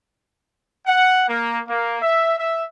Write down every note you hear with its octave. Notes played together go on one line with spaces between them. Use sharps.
F#5
A#3
A#3
E5
E5